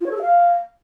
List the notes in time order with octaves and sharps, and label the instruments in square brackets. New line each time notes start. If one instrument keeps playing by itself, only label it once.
[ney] F4
C#5
A4
G#4
F5